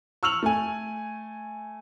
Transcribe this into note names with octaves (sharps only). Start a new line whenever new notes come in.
C#6 E6 F6 F7 F#7
A3 G#5